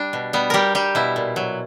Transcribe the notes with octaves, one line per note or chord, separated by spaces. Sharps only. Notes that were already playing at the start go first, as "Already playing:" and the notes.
Already playing: G3 D4
B2
G3 B3
G3 G4 A#4
G3 G4
B2 E4
A#2
F#3